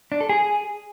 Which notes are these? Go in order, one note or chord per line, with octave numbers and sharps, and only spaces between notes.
D4
A4
G#4